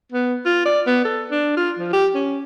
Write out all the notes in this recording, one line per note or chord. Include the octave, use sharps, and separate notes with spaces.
B3
F4
D5
B3
A4
D4
F4
F3
G4
C#4